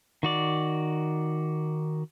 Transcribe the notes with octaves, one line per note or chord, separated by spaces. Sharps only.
D#3 F#4 D5